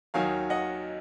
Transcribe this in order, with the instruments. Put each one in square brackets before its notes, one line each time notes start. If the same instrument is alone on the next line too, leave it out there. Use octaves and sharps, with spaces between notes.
[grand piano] D#2 D#3 F#3 F5 G#5
D#5 F#5